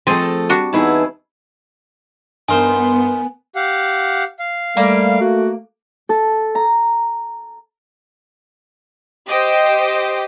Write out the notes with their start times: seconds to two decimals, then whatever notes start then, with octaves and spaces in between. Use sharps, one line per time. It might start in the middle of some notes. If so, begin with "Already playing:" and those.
0.07 F3 A3 C4 G#4 A4 D#5 A5
0.49 G3 D4 F#4
0.73 E2 B3 C#4 D#4 E4 G#4 A5
2.49 G2 B3 D#4 A#4 C5 G#5 C6
3.56 G4 F5 F#5
4.39 F5
4.77 G3 A3 A#3
5.21 F#4
6.09 A4
6.55 A#5
9.28 G4 C5 D#5